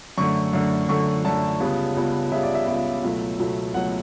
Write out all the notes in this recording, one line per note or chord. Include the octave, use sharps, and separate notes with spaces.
F#2 D3 A3 C#6
F#2 D3 A3
F#2 D3 A3 C#6
F#2 D3 A3 A5
C#2 C#3 G3 B3
C#2 C#3 G3 B3
C#2 C#3 G3 B3 E5
D5
E5
C#2 C#3 G3 B3
C#2 B2 F#3 A3
C#2 B2 F#3 A3
C#2 B2 F#3 A3 F#5